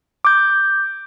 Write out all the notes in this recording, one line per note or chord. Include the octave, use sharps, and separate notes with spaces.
D6 G6